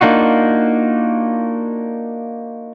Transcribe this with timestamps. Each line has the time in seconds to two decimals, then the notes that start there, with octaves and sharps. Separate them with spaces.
0.01 A#3 D4 D#4 F4 F#4